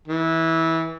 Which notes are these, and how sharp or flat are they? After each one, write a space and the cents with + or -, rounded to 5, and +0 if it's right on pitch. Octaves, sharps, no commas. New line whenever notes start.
E3 -20